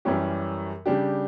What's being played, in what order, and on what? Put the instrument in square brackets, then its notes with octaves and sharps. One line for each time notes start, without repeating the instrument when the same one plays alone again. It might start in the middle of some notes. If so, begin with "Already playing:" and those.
[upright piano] F#2 E3 G3 C#4 G4
C#3 G3 D4 G4